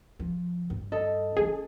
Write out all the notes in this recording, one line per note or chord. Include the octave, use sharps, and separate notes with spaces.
F3
G2
A4 D#5
E3 C#4 G#4